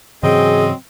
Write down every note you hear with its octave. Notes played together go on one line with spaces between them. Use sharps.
G#2 C#3 E3 F#3 C4 G#4 D#5